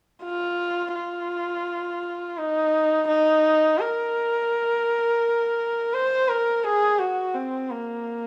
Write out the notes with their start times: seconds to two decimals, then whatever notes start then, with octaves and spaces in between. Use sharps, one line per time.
0.24 F4
0.95 F4
2.38 D#4
3.08 D#4
3.79 A#4
5.94 C5
6.29 A#4
6.64 G#4
6.99 F#4
7.35 C4
7.71 A#3